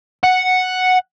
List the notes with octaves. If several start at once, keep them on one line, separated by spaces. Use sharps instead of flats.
F#5